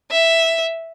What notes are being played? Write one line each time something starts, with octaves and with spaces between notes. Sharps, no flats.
E5